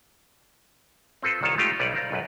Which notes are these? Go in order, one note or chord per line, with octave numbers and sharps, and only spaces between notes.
C4 F4 A4 B4 C5
C2 D#3 F4 A4 C#5 A5
G#3 A3 D#4 F4 G4
B1 G3 B4 C#5 D5
A#4 C5 D5 F5
B1 F#2 B4